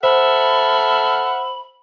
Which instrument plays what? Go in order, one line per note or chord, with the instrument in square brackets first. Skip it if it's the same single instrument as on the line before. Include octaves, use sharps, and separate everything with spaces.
[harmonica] A4 F#5 F6 [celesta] C5 [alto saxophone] E5 [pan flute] B5